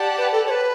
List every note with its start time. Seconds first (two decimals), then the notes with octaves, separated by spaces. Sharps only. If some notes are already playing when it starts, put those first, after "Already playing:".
Already playing: G4 D5 F#5 A5
0.18 B4
0.32 A4
0.47 C#5
0.50 B4